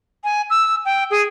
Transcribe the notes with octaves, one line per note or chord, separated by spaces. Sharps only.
G#5
E6
G5
G#4